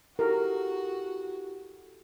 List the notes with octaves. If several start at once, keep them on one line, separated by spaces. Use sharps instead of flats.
E4 F#4 G4 A4 A#4